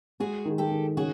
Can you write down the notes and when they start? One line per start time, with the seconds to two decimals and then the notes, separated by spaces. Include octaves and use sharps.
0.20 G#3 F#4 G#4
0.45 D#3
0.58 G4 A4
0.71 D#3
0.97 C#3 F#4 G#4